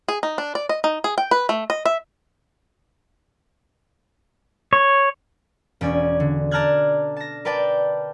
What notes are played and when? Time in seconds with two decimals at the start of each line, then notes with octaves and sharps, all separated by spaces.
0.08 G#4
0.23 D#4
0.38 D4
0.55 D5
0.69 D#5
0.84 D#4
1.04 G#4
1.18 G5
1.31 B4
1.49 A3
1.70 D#5
1.85 E5
4.73 C#5
5.81 E1 C#4 D5 G#5 G#6
6.20 D3
6.51 D5 A5 A#5 F6 F#6 G#6
7.17 A5 A#6
7.45 A#4 B4 D5 G5 A5 B5